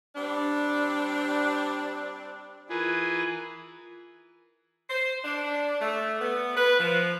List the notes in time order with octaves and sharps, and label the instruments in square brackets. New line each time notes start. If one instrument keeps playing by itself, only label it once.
[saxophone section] G3 C4 D4
[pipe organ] E3 G#4 B4 [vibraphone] F4 A#4 A#5
[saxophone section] C5
D4
A3
B3
B4
F3